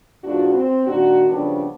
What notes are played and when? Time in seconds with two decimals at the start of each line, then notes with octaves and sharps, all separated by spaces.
0.24 E2 G#2 D4 F4 F#4
0.54 C4
0.86 A#2 D#3 D4 F#4
1.29 C#3 F3 G3 B3 D4